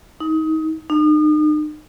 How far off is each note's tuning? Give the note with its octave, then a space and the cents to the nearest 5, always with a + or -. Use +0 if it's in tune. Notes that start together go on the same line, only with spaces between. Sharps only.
D#4 +25
D#4 -40